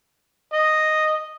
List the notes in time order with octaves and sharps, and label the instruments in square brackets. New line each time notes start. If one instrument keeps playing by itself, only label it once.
[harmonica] D#5